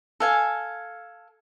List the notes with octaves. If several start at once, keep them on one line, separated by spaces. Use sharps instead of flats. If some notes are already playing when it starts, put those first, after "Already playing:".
A4 F5 G#5